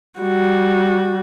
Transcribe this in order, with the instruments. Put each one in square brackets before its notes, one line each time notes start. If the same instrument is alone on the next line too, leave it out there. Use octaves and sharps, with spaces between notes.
[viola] G3 F#4